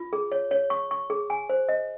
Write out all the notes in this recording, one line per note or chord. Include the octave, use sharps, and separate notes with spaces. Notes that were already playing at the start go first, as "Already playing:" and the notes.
Already playing: F4
G#4
C#5
C#5
C#6
C#6
G#4
G#5
C5
D#5